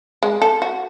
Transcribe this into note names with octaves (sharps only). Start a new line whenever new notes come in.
G#3
A4
F#4